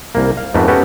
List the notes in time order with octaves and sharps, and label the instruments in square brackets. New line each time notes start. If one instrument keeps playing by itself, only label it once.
[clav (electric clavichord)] C2 A#3
F5
F2 G#2 A3 B3 A#4
B3 C#4 F#4 G4 A4 B4